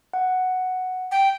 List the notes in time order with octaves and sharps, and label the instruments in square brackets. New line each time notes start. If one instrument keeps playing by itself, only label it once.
[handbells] F#5
[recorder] G5